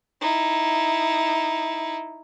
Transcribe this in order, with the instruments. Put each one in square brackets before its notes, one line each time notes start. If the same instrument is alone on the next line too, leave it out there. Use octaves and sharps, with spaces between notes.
[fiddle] D#4 E4